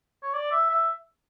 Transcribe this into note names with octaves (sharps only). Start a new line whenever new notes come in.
C#5
D5
E5
E5